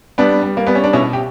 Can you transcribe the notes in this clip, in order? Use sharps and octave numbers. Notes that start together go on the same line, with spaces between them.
G3 B3 D4
G3
A#3
G3 B3
C#4
D4
B2 C#4 E4
G4